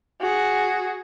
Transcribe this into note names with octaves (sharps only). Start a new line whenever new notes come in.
F#4 G#4